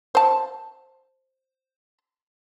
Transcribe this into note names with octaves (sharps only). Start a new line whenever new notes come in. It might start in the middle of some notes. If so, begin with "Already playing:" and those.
C5 A5